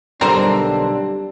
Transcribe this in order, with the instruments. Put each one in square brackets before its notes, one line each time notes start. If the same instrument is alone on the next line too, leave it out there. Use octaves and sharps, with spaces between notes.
[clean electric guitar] B1 D3 C4 [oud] G3 [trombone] D4 [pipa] A#4 C5